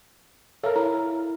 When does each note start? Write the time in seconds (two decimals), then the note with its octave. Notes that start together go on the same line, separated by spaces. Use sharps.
0.63 A4 A#4 C#5 E5 F5
0.76 E4 A#5